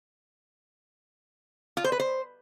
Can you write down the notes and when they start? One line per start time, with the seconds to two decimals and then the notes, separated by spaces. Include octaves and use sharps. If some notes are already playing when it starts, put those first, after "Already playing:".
1.77 F4
1.84 C5
1.92 B4
2.00 C5